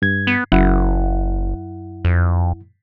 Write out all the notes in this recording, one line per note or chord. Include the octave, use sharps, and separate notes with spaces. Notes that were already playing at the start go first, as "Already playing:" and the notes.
G2 G#6
B3
F#1 F#2 E4 F#5
F2